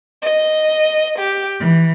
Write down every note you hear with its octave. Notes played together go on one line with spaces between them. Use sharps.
D#5
G4
E3